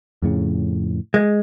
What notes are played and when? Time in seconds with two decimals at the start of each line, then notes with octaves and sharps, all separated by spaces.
0.22 F2 A2 C#3
1.14 G#3